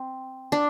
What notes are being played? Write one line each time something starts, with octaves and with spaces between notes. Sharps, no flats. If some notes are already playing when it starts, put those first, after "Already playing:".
Already playing: C4
D4